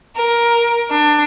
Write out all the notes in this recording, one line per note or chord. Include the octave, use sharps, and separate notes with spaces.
A#4
D4